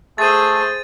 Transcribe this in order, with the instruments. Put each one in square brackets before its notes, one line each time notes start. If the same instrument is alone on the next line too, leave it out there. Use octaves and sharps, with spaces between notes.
[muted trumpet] A3 [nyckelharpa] G#4 C5 [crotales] A6 D#7